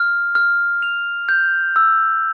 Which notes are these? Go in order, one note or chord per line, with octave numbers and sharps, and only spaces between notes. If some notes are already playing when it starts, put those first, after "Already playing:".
Already playing: F6
F6
F7
G6
E6